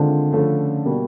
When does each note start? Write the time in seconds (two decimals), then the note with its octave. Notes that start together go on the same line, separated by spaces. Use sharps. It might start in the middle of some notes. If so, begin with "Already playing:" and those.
Already playing: D3 D#3 G#3 C4 F4
0.32 C#3 F3 A3 C#4 F4
0.85 B2 G3 A#3